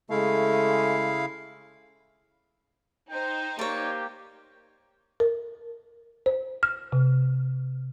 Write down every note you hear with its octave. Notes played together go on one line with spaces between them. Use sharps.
C#3 G#3 A3 E4 F5
D#4 C5 G5
A#3 G4 C#5 D5
A#4
C5
F6
C3